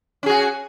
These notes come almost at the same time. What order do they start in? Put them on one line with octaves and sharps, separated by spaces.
C#4 G#4 F#4